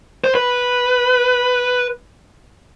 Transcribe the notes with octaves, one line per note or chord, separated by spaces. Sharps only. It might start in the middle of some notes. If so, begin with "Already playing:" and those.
C5
B4